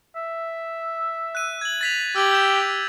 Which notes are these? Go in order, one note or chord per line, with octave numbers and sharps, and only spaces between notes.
E5
F#6 D#7
G#6 F#7
A6 B6 F7
G4 E6 G#6 F#7
E6 G6 E7